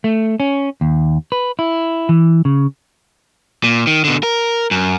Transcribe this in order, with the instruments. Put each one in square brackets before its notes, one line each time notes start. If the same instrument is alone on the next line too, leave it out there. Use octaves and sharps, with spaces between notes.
[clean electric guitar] A3
C#4
D#2
B4
E4
E3
C#3
[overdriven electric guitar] A#2
D#3
B2 D3
A#4
F#2